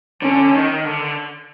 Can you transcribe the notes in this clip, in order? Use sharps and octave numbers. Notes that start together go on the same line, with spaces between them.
D3 C#4
D#3
D3